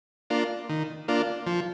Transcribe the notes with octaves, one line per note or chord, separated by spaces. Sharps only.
A#3 D4 F4
D#3
A#3 D4 F4
F3